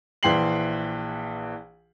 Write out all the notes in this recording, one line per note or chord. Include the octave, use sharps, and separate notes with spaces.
A#1 E3 G5 C6 C7 F#7